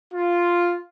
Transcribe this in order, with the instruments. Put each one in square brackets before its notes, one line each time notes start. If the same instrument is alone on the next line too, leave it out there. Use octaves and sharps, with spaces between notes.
[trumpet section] F4